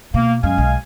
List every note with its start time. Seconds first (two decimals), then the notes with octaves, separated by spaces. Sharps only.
0.14 B2 A#3
0.43 F#2 G#3 F5 G#5
0.58 B1